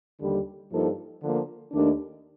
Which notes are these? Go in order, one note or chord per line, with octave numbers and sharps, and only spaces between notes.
D#2 D3 G3
G2 F3 A#3 D#4 A4
D3 F3 A#3
D#2 D#3 A3 D4